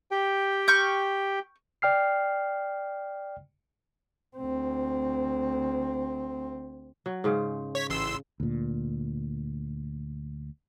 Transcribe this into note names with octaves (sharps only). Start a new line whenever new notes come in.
G4 G5
C#6 F6 G6
D5 G5 F6 C7
D2 C4
F#3
G#2 C#3 C5
C#5 B6
A1 C6 E6
D2 A#2